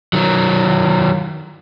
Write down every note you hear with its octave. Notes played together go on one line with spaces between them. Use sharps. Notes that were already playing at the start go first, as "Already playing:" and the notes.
D#3 F#3